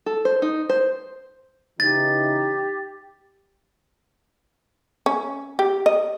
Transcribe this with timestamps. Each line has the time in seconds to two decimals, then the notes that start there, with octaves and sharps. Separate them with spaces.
0.06 A4
0.25 C5
0.42 D#4
0.69 C5
1.80 C#3 E3 D#4 G4 A6
5.06 C#4
5.59 G4
5.86 D#5